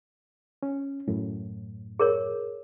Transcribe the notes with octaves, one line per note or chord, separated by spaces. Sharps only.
C#4
F#2 A2
G#4 A#4 C#5